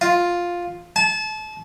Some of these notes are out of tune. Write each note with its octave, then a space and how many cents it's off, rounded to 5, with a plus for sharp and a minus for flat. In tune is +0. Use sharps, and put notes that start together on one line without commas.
F4 +5
A5 -30